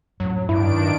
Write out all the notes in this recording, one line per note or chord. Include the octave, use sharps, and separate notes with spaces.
F#2 A2 F#3
G2 D#3 D4 E4 D7